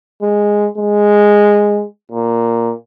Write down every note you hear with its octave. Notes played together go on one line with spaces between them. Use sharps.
G#3
G#3
A#2